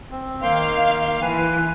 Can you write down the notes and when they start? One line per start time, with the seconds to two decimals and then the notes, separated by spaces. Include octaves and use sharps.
0.11 C4
0.42 D#3 A#3 F5 G5 C6
1.22 E3 B4 G#5